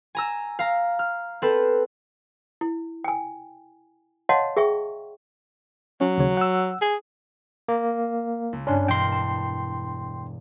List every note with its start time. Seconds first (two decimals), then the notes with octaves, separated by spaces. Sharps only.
0.15 G#5 A#5 E6
0.59 F5 A#5
0.99 F6
1.42 C4 A4 B4
2.61 E4
3.04 G5 G#5
4.29 C#5 D#5 F5 F#5 A5 C6
4.57 G#4 E5 G5 C#6
6.01 F#3 C#4
6.18 D#2 C#3 C#5
6.37 F#5 E6
6.81 G#4
7.68 A#3
8.53 C#2
8.67 G2 C#4 D4 C6 F#6
8.88 E1 A#4 G5 C6
9.12 A5